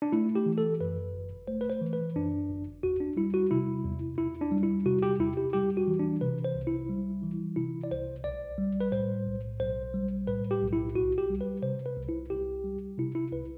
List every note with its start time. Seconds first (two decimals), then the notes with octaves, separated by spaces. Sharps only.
0.02 D4
0.12 A3 E4
0.35 G4
0.46 E3
0.58 A4
0.81 F#2 B4
1.14 G1
1.47 A3 C5
1.61 B4
1.70 C5
1.82 E3
1.93 B4
2.16 F#2 D4
2.50 G1
2.83 E2 F#4
3.00 D4
3.16 G3 E4
3.34 F#4
3.51 C3 E4
3.85 E2
4.18 E2 E4
4.41 D4
4.52 G3
4.63 E4
4.86 C3 F#4
5.02 G4
5.19 E2 E4
5.37 G4
5.53 G3 G4
5.77 F#4
5.87 E3
5.99 D4
6.21 C3 B4
6.44 C5
6.55 C2
6.67 E4
6.89 G3
7.23 E3
7.56 C3 E4
7.84 D5
7.91 C2 C5
8.24 B1 D5
8.58 G3
8.80 B4
8.92 A2 C5
9.27 B1
9.60 B1 C5
9.94 G3
10.28 A2 B4
10.51 G4
10.62 B1
10.73 E4
10.95 C2 F#4
11.18 G4
11.30 G3
11.41 B4
11.63 C3 C5
11.86 B4
11.97 C2
12.09 E4
12.30 C2 G4
12.64 G3
12.98 C3 E4
13.15 E4
13.32 C2 B4